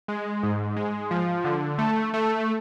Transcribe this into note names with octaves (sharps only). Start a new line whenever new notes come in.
G#3
G#2
G#3
F3
D3
A3
A3